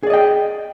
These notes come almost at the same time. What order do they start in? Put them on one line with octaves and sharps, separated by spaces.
G#4 D5 D#5 G5